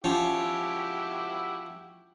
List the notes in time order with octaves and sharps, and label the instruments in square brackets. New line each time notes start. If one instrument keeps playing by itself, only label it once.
[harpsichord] F3 C#4 [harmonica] E4 F#4 G4